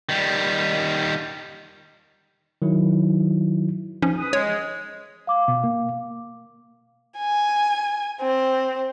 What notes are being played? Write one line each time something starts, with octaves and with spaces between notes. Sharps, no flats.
D#3 G3
D#3 F#3 E4
F3 C#4 D#4
B4 D#6
G#3 C#5
F5 D6
B2
A#3
G#5
C4